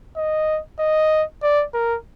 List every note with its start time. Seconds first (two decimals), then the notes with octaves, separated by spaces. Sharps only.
0.16 D#5
0.79 D#5
1.42 D5
1.74 A#4